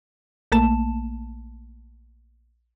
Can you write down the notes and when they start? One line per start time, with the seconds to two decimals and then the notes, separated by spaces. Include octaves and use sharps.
0.52 A#1 A3 A#3 A5 E7